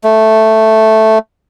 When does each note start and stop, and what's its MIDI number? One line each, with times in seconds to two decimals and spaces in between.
0.04 1.18 57